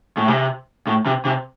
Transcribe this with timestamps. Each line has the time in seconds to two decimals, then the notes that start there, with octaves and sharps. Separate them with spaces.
0.17 A2
0.28 C3
0.87 A2
1.06 C3
1.25 C3